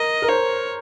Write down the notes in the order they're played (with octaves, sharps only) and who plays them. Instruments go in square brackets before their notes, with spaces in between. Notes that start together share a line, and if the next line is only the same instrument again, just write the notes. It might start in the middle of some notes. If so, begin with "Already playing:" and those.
Already playing: [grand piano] A#4 [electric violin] D#5
[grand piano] A#4
[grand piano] C5 [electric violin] C#5